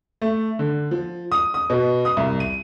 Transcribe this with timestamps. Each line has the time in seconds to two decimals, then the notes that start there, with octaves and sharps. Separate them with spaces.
0.22 A3
0.59 D3
0.91 F3
1.32 D#6
1.54 D#6
1.70 B2
2.05 D#6
2.17 C2
2.40 D#7